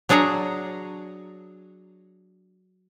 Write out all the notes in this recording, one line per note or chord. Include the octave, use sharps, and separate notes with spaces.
F#3 D4 G#4 C#5 A#5